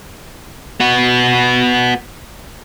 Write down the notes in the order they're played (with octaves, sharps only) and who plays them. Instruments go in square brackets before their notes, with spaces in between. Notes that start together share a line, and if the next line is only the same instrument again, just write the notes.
[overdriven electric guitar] B3 F#4